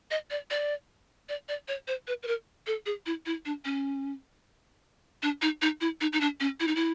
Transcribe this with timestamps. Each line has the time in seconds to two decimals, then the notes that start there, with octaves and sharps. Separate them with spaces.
0.11 D#5
0.31 D5
0.50 D5
1.29 D5
1.49 D5
1.68 C#5
1.88 C5
2.08 B4
2.23 B4
2.27 A#4
2.67 A4
2.86 G#4
3.06 E4
3.26 E4
3.45 D4
3.65 C#4
5.23 D4
5.42 D#4
5.62 D#4
5.81 E4
6.01 D#4
6.13 D#4
6.21 D4
6.40 C#4
6.60 E4
6.68 D#4
6.75 E4